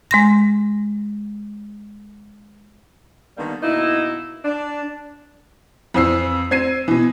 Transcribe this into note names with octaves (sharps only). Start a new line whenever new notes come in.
G#3 C6 A#6
D3 D#3 G3 A#3 B3
B2 A#3 D#4 E4
D4
F2 E3 C4 E6 C7
C4 G#6 C7 D#7
B2 E3